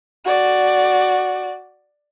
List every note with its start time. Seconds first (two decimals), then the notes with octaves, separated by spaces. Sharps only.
0.25 F#4 D5